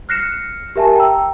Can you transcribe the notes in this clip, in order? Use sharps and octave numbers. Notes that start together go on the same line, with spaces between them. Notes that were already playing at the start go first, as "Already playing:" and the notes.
F6 F#6 A#6 C7 C#7 E7
G4 A#4 E5 G#5 A5
G5 A#5 E6